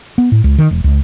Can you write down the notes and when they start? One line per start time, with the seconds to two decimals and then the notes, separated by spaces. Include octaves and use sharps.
0.18 B3
0.32 A2
0.44 C#2
0.58 D#3
0.71 E1
0.84 C#2